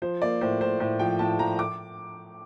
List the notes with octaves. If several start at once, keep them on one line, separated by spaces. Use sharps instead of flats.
F3 C5
A#3 D5
A2 C5
A2 C5
A2 C5
F3 G5
A2 A5
F3 A#5
D6